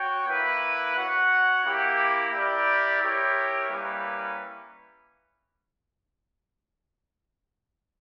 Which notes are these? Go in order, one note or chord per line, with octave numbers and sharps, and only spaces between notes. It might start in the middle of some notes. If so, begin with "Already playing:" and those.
Already playing: F#4 C#5 G5
A#3 E4 B4
F#4 C#5 F#5
A#3 E4 G4
E4 G4 A#4 D5
E4 G4 A#4 C#5 G5
G3 A#3 C#4 E4 B4